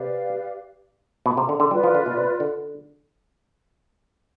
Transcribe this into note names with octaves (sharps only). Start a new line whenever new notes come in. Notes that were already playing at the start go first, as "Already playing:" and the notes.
Already playing: C3 G4 B4 D5 F5
B2
C3
D3
D3
G3 F4 B4 D5
F3
D3
B2
C3
D3